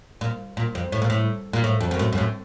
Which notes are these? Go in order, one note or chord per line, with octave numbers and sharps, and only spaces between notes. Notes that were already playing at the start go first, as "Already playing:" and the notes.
A#2
A#2
F2
A2
A#2
A2
A#2
A2
F2
F#2
A2
F#2
A2